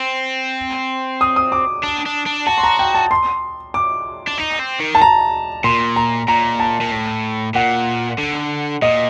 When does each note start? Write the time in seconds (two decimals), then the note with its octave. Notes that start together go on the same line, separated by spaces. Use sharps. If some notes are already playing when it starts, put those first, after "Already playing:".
Already playing: C4
1.21 D#6
1.36 D#6
1.52 D6
1.83 D4
2.06 D4
2.26 D4
2.47 F#4 A5
2.58 C6
2.63 A#5
2.79 G5
2.95 A5
3.11 C6
3.74 D6
4.28 D4
4.38 D#4
4.59 C4
4.80 D#3
4.95 A5
5.01 A#5
5.64 A#2 C6
5.96 A#5
6.28 A#2 A#5
6.60 A5
6.81 A#2
6.92 A2
7.55 A#2 F#5
8.18 D3
8.82 A#2 D#5